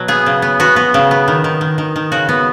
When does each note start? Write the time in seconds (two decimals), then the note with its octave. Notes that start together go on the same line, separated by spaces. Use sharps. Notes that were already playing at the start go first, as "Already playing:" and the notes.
Already playing: B2 F#3
0.08 B3 G#4
0.26 C#3
0.42 B3
0.60 B3 F#4
0.76 B3
0.94 C#3
1.11 B3
1.28 D#3
1.44 D#3
1.61 D#3
1.78 D#3
1.96 D#3
2.12 C#3 F#4
2.29 B3